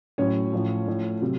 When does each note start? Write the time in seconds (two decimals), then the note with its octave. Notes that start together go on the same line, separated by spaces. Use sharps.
0.18 A2 F#3 C#4 C#5
0.53 A2 F3
0.88 A2 F3
1.21 C3 F#3